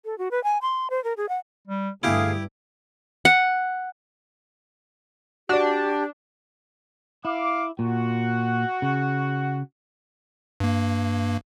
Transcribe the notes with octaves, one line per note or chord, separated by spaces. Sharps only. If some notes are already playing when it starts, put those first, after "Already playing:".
A4
F#4
B4
G#5
C6
C5
A#4
G#4
F#5
G3
G2 D3 A3 E4 G4 G#4 F5
F#5
D4 F#4 G4 D5
E4 F5 D6
A#2 F#4 F#5
C#3
G2 A#3